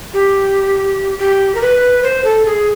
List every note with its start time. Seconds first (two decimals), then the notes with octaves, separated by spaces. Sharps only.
0.14 G4
1.19 G4
1.55 A#4
1.61 B4
2.03 C5
2.24 A4
2.46 G#4